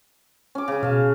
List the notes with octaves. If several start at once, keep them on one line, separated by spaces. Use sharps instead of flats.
C#4 D6
C#3 G#5
B2 F5 A5